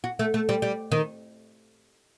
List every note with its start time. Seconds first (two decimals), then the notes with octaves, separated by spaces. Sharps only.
0.04 F#4
0.19 A3
0.34 A3
0.49 G3
0.62 G3
0.92 D#3